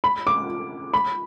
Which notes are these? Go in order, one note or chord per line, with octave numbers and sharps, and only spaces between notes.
B5
D6
B5